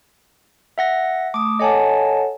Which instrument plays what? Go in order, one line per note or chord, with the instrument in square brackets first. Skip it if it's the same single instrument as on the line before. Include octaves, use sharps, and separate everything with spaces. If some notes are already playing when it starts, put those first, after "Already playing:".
[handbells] E5 F#5 A#6
[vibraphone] A3 D#6 [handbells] D6
[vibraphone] A4 C#5 F#5 [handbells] D#5 G#5 A5